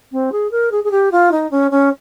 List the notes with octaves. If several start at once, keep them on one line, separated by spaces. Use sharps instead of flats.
C4
G#4
A#4
G#4
G#4
G4
F4
D#4
C#4
C#4